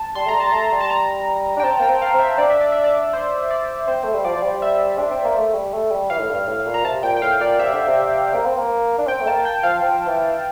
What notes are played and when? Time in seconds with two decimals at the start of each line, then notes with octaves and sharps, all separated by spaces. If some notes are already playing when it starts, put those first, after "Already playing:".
Already playing: A5
0.15 G3 C6
0.26 A3 A#5
0.34 G3
0.40 A5
0.52 A3 A#5
0.72 G3
0.81 A5
0.90 A#5
1.57 D4 G5
1.64 C4 A5
1.80 A#3 G5
1.89 C4
2.02 F5
2.14 C4
2.20 E5
2.38 D4 D5
2.50 E5
2.61 D5
2.72 E5
2.84 D5
3.13 C5
3.51 D5
3.87 C4 C5
4.04 A3
4.15 G3
4.25 F3 D5
4.37 F3
4.43 G3
4.62 E5
4.99 D4
5.11 C4
5.24 A#3
5.37 A3
5.54 G3
5.74 A3
5.91 G3
6.10 E3 F5
6.19 A2
6.30 G2
6.47 A2
6.67 A#2
6.74 A#5
6.85 C3 A5
7.03 A#2 G5
7.17 G5
7.22 A2 F5
7.40 A#2 D5
7.59 C3 E5
7.72 D3
7.87 C3
8.34 A#3
8.46 C4
8.58 A#3
8.98 D4
9.07 C4 G5
9.21 A3
9.27 A#3 A5
9.45 G5
9.63 F3 F5
9.82 F3
10.07 E3